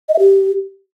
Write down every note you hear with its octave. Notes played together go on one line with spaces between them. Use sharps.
D#5
E5
G4